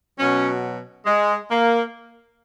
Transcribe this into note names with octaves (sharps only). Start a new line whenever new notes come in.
B2 F#3 C#4
G#3
A#3